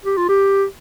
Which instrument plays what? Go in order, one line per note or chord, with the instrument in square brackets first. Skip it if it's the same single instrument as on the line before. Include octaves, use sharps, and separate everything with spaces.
[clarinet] G4
F4
G4